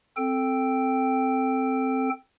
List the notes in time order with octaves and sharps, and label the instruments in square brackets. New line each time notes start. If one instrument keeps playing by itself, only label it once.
[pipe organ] C4 A4 G5